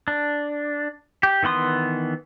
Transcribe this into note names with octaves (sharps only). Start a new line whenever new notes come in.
D4
G4
D#3 E3 B3 C6 D#6